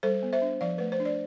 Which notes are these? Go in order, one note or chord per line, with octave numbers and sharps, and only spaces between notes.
G3 A4 C5
B3
C5 E5
D4
F3 D5 F5
A3 B4
C5
D4
D5